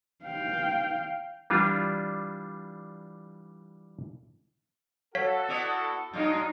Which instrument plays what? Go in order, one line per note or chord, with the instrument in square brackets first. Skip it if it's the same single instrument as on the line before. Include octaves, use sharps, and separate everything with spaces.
[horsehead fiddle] F5 G5
[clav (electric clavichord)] E3 G3 D4 F4
[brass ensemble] F#4 A4 [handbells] C#5 F5 B6
[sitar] B3 E4 D5
[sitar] F#3 G#3 [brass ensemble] D4 F4 [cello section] D#4